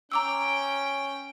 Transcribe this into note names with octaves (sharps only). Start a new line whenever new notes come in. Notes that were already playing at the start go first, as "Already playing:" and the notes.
C#4 G5 A#5 D6 E6